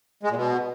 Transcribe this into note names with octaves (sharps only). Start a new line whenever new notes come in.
G#3
A#2
B2